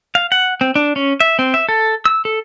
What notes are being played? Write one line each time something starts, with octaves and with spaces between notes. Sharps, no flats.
F5
F#5
C4
D4
C#4
E5
C4
E5
A4
E6
A4